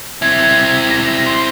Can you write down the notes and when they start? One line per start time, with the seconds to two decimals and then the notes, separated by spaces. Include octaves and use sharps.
0.22 C4 E4 G#6
0.90 A#6
1.26 C6